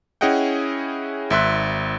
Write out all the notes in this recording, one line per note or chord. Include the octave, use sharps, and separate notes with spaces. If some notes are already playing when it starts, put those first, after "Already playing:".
C#4 E4 G#4 D#5 F#5 G5
G#1 E5 C6 F#6